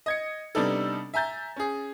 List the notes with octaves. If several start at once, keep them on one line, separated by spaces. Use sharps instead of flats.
D#5 G#6 C#7
C3 G3 B3 D4 D#4 A4
E5 G#5 A#5 G6 A6
C#4 G#4